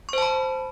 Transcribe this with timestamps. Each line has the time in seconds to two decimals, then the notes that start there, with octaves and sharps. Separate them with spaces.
0.09 C#6
0.13 C5
0.18 A5
0.22 B5